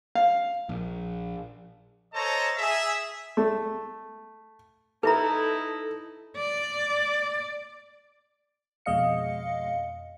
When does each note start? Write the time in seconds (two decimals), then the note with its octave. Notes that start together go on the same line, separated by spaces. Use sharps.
0.15 F5
0.69 A#1
2.14 A4 C5 C#5 D#5 A5 A#5
2.57 G#4 E5
3.37 A3
5.03 D#4 E4 A4 B4 E5 A#5
6.38 D5
8.86 F2 B2 G#3 D#5 F5 C#7